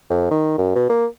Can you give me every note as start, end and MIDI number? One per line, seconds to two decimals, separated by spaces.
0.10 0.29 41
0.31 0.54 51
0.58 0.74 42
0.75 0.85 47
0.89 1.06 58